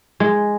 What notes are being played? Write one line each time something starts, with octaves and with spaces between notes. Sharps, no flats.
G#3